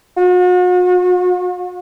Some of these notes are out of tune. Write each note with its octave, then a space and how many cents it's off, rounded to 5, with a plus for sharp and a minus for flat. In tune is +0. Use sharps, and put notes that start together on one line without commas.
F#4 -40